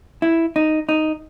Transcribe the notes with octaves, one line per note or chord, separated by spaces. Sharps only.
E4
D#4
D#4